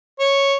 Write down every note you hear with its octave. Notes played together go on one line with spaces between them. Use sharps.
C#5